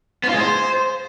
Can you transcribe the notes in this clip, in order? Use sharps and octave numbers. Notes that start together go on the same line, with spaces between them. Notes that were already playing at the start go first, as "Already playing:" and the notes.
B3
F4
G#3
C5